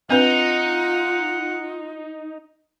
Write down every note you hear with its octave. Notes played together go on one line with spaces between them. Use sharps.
C4 D4 D#4 F4 B4 F#5